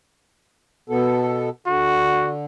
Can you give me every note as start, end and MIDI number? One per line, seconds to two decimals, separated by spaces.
0.90 1.49 47
0.90 1.49 59
0.90 1.49 69
1.67 2.45 50
1.67 2.33 66